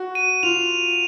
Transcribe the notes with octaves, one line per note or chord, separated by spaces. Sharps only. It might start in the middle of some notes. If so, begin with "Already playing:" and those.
Already playing: F#4
D#7
F4 F7